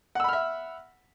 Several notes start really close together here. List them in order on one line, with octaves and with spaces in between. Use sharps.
F#5 E6 B5 F6 E5